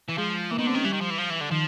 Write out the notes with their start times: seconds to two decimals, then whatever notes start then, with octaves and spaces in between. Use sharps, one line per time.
0.09 E3
0.18 F3 G#3
0.51 E3 A#3
0.58 D#3 B3
0.66 D3 C4
0.74 D#3 C#4
0.84 E3 G3
0.93 D#3
1.01 F3
1.10 E3
1.18 F3
1.30 E3
1.41 D3
1.51 D#3 F3